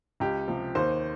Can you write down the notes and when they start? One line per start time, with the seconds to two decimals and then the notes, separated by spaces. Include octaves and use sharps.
0.20 C#2 G4
0.48 C3 F3
0.75 D#2 C5